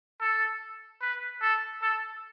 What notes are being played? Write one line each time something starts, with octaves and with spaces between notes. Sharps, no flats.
A4
B4
A4
A4